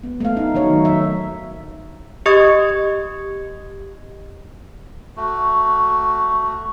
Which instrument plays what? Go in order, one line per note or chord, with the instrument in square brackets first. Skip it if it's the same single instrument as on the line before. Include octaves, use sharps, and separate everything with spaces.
[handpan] B3
A3 F5
D#4
D#3 F#3 D#4 C#5
E5
[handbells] G4 D#5 C#6 D#6 G#6
[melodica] A3 F#4